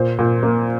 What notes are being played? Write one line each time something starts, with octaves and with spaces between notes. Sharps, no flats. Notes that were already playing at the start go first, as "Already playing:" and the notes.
Already playing: A#2 C5
A#2
A#3